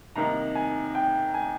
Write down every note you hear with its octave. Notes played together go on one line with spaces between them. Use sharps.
C2 C3 D#3 A#3 D#4 A#5
G#5
G5
G#5